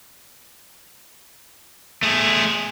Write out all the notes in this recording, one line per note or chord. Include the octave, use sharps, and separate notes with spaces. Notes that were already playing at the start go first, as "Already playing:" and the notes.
A3 G#4